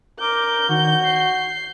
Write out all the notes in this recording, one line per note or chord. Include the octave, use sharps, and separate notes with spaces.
A#4 D6 G6
D#3 F#4
C7